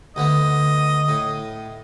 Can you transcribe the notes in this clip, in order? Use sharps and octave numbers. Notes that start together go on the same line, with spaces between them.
D2 D3 B3 D#5
A2